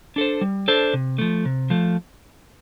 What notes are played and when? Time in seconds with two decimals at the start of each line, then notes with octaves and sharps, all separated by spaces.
0.16 D4 A4 C5
0.41 G3
0.68 D4 A4 C5
0.93 C3
1.18 F3 A3
1.45 C3
1.70 F3 A3